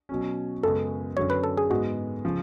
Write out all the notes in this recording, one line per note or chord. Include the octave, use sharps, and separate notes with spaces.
B2 F#3 C#4
F#2 C#3 G#3 B3 A4
F#2 D3 F#3 C#5
B4
A4
G#4
G#2 G#3 B3 F#4
C#3 F3